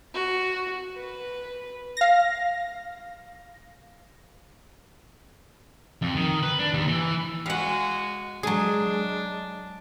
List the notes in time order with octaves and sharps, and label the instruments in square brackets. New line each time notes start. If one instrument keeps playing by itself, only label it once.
[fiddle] F#4
B4
[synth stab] F5 A#6
[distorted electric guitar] F2
D#3
B4
D4
D#2
E3
[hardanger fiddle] G#3 F#4 [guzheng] F5 F#5
[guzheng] F#3 G#4 [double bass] G#3 [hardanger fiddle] D4